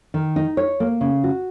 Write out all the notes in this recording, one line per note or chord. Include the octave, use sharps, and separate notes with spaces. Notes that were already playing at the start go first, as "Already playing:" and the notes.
D#3
D#4
C#5
A#3
C#3
F#4